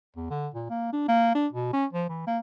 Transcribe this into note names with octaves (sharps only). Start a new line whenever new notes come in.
E2
D3
A#2
A#3
D4
A#3
D4
B2
C#4
F3
E3
A#3